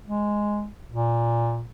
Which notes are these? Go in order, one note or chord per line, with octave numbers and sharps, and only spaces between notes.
G#3
A#2